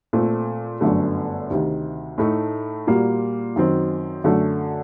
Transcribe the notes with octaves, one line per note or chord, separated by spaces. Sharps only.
A#2 A3 C4
G1 F#2 D3 A3
D2 C3 D#3
A2 A3 D#4
A#2 G3 A#3 F#4
F#2 D#3 F#3 C4
F#2 D3 F#3 A3